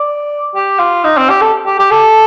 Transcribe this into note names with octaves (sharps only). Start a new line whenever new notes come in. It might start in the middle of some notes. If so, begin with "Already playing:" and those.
Already playing: D5
G4
F4
D#4
C4
G4
A4
G4
G4
A4